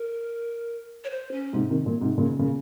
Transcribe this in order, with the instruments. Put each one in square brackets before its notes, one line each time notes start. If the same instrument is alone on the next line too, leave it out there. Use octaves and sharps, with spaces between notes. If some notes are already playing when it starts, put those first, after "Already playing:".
Already playing: [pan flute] A#4
C#5
C5
C#4
[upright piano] G#2 C3
C3 D#3
A#2
G#2 C3
A#2 C#3
A#2 C#3